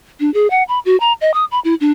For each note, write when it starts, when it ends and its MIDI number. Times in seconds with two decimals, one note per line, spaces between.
0.20 0.32 62
0.34 0.47 68
0.51 0.63 78
0.68 0.79 83
0.85 0.98 66
1.00 1.13 82
1.21 1.31 75
1.34 1.45 87
1.51 1.59 83
1.64 1.75 64
1.81 1.92 62